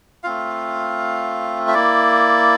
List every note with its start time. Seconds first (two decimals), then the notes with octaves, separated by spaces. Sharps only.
0.24 A3 C4 F4 F5
1.68 E5
1.74 A#3 E4 D5